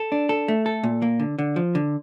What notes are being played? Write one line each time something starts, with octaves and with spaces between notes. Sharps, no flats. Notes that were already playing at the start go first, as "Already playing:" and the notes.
Already playing: A4
D4
A4
A3
A4
A#2
A#3
D3
D3
F3
D3